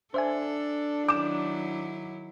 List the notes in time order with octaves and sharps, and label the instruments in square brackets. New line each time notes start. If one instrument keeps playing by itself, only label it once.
[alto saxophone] D4 [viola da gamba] A4 [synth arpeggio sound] C5 E5 G#5
[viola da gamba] D#3 F#3 E4 [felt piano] D6 E7 [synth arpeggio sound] G6